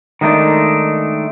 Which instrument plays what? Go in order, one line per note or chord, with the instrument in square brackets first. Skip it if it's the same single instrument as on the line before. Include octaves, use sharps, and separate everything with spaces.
[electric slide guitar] D#3 G#3 A3 D4 D#4